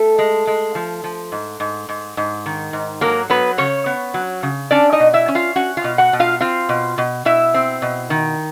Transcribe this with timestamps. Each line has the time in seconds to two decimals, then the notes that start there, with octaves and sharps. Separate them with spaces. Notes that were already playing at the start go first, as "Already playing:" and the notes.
Already playing: A3 A4
0.18 G#3
0.47 G#3
0.75 F3
1.04 F3
1.32 G#2
1.60 G#2
1.89 G#2
2.17 G#2
2.46 D#3
2.73 G#2
3.01 F#3 A#3 A#4
3.30 F#3 B3 B4
3.58 C#3 C#4 C#5
3.86 B3
4.14 F#3
4.43 C#3
4.71 C#4 D4 D5
4.92 D#4 D#5
5.00 B2
5.13 E4 E5
5.28 C#4
5.35 F4 F5
5.56 C#4 F#4 F#5
5.77 F4 F5
5.84 B2
5.98 F#4 F#5
6.13 B2
6.20 F4 F5
6.40 C4 F4 F5
6.69 B2
6.98 B2
7.25 B2 E4 E5
7.54 C4
7.82 B2
8.10 D#3